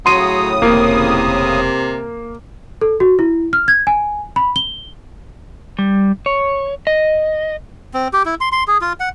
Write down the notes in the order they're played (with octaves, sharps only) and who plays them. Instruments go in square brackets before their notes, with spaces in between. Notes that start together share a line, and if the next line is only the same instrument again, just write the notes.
[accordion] A2 C#3 D#6 [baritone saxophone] F#3 [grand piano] C6 D#7
[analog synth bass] E1 [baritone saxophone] C3 [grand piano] A#3
[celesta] A4
F#4
E4
F6
G#6
G#5
B5
G7
[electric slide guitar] G3
C#5
D#5
[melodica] C4
G4
E4
C6
C6
G#4
F4
F#5